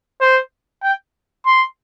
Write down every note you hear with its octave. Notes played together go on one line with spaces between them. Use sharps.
C5
G5
C6